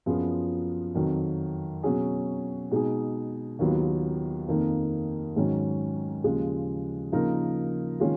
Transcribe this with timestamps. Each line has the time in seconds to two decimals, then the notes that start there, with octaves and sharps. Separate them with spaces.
0.06 F#2 F3 B3 F4 G#4
0.95 F2 D#3 F#3
1.83 B2 F#3 C#4 G#4
2.71 B2 G#3 D#4 G#4
3.59 D#2 D#3 F#3 B3 F4
4.48 F2 D#3 A#3 D#4
5.36 G#2 D#3 F#3 C#4
6.24 D#2 C#3 F3 G#3
7.12 C#3 F3 A#3 D#4 A#4
8.00 D#3 G#3 C#4 F4